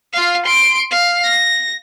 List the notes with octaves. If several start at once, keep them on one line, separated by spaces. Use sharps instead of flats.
F4 F5
C6 D7
F5
A#6